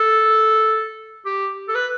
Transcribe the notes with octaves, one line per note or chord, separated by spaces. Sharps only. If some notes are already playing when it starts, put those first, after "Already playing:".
Already playing: A4
G4
A4
B4